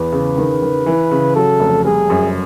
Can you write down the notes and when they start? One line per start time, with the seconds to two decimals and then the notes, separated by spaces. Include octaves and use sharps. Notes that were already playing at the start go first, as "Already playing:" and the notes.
Already playing: E2 B4
0.12 C#3
0.37 D#3
0.62 D#3
0.86 E3
1.11 C#3
1.35 F#3 A4
1.60 F1
1.85 G3 G#4
2.10 F#2